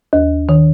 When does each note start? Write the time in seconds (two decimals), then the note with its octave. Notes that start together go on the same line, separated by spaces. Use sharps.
0.13 D#2
0.49 D#3